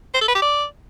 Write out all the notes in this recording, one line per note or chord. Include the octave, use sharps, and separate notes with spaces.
C5
A4
B4
G4
D5